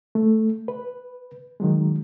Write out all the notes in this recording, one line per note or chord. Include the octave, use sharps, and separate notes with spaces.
A3
B4
D#3 F#3 G#3